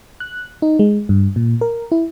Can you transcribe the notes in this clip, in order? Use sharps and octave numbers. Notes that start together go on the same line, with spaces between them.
F#6
D#4
G#3
G2
A#2
A#4
E4